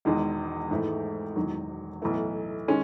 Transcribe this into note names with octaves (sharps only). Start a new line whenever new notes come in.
E1 E2 D#3 G#3
G#1 G#2 E3 A3 E4
E1 E2 D#3 F#3
B1 A2 E3 A3 E4
D#3 G#3 C#4